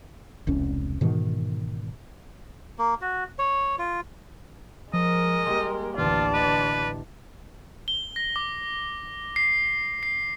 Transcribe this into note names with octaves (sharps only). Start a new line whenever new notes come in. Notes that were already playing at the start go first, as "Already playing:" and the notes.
E1 C2 C#4
G#2 B2 D#3 E3
A#3
F#4
C#5
F4
F3 G#3 A#4 D#5
G3 A#3 G4 C6
A1 D2 F4 D5 A5
B4 D#5
G7
A#6
D6
C7
C7